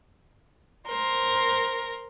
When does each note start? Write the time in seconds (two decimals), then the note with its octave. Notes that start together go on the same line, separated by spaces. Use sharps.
0.88 A#4 C5